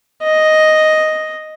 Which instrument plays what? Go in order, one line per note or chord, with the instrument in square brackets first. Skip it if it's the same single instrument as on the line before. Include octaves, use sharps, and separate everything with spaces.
[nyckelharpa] D#5